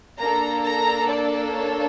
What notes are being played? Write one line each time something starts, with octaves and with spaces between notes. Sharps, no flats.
A#3 D4 A4 A#5
A#5
D5
C#5